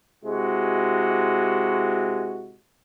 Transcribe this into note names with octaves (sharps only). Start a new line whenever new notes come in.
C3 G#3 E4 F#4